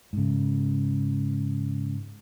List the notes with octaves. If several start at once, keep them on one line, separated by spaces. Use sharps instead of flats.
G#2 C#3